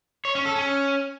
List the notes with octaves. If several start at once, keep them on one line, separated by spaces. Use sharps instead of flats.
C#5
C#4
A4
C#4